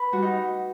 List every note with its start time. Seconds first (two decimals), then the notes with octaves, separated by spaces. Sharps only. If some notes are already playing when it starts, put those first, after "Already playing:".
Already playing: B4
0.12 G3 F#4
0.22 D#4